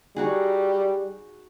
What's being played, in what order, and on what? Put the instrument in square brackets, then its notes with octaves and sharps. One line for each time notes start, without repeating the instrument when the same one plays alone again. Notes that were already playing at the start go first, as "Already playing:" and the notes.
[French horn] G3 [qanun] D#4 F#4 G#4